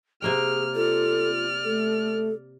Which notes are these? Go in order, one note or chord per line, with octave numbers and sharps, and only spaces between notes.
C3 A#3 G#4 G5 F6
F4 A4 D5 F6
A3 A4